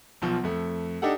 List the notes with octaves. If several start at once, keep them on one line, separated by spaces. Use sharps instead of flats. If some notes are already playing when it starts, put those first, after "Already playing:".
B1 B2 F3
F2 A3
D4 D#4 G4 A4 F#5